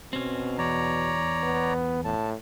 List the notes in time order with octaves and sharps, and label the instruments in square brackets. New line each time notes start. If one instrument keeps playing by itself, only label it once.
[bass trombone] B2 [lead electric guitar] C4 C#4
[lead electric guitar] E2 [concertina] C#5 D5 A#5
[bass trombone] B3
[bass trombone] A2 [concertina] A5